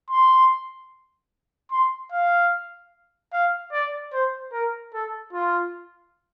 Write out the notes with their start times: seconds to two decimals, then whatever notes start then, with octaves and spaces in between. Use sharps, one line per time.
0.10 C6
1.72 C6
2.12 F5
3.33 F5
3.72 D5
4.13 C5
4.52 A#4
4.94 A4
5.33 F4